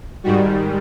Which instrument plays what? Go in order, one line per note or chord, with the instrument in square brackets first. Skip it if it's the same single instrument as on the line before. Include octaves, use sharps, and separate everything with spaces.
[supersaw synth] G#2 D#3 G3 F#4